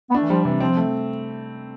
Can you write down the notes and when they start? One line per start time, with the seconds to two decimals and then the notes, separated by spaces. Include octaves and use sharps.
0.10 B3
0.15 A3 D4
0.23 E3
0.30 F3 G3
0.45 C3 E3
0.60 F3 C4
0.77 A3